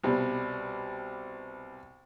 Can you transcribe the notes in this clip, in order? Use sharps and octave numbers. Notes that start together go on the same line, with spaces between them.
C2 B2 G3